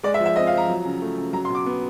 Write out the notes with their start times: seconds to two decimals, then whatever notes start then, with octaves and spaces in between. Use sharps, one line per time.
0.03 G#3 D5
0.14 E5
0.20 F3
0.25 E5
0.36 C4 D#5
0.47 F5
0.53 F3 A#5
0.68 F#3
0.85 C#3
1.02 A3
1.18 C#3
1.33 F#3 A#5
1.45 C6
1.49 B2
1.55 D6
1.66 B3